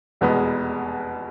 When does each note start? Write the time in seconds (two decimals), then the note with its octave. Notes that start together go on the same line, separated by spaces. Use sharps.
0.21 F1 E2 B2 G#3 B3